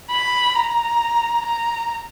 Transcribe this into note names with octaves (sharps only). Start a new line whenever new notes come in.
B5
A#5
A#5